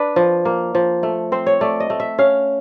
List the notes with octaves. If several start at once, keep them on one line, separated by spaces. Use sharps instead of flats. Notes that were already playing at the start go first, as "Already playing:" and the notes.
Already playing: D4 B4
F3
A#3
F3
A3
C4 C5
C#5
A3 D5
D#5
A3
E5
C#4 F5